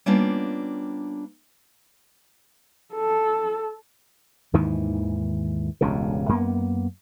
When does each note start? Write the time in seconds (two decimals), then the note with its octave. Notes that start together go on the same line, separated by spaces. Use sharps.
0.06 G3 A#3 B3 C#4 D4 F4
2.94 A4
4.53 D#2 G#2 D#3 E3
5.81 E1 C#2 G2 C#3
6.29 F#2 A#3 B3